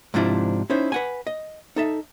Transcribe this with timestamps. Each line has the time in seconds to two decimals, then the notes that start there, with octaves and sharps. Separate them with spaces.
0.14 G#2 C3 F3 D4 E4
0.70 C#4 D#4 E4 C5
0.92 B4 F#5 G#5
1.27 D#5
1.76 D#4 A4 E5